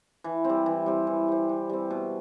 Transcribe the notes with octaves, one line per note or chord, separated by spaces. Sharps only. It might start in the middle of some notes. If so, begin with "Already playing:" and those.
E3
G3 C4
E3
G3 C4
E3
G3 C4
E3
G3 C4
B2